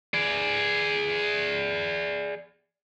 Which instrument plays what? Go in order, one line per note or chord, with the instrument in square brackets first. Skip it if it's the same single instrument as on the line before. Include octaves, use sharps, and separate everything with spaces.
[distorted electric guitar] G#4 D5